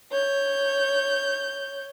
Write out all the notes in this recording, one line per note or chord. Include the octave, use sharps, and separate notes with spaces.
C#5 G6